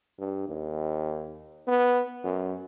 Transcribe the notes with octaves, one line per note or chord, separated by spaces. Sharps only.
G2
D#2
B3
F#2